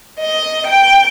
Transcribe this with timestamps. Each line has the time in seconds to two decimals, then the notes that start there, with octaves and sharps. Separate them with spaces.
0.19 D#5
0.66 G5